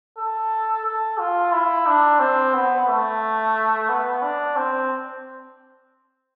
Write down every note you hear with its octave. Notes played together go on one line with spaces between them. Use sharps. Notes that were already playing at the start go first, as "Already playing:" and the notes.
A4
A4
F4
E4
D4
C4
B3
A3
B3
D4
C4